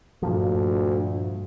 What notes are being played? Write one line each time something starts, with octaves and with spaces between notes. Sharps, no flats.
D2 G2 A#2 F3